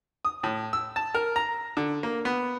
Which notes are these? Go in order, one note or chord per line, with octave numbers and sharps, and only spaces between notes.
D#6
A2
E6
A5
A#4
A#5
D3
A#3
B3